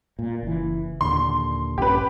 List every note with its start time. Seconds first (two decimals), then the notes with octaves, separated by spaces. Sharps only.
0.19 A#2
0.43 F#1 E3
1.01 D#2 A#2 D3 C6
1.78 A#1 G2 C#4 G4 B4